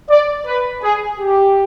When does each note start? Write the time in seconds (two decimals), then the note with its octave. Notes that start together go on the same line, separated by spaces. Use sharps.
0.10 D5
0.46 B4
0.83 G#4
1.19 G4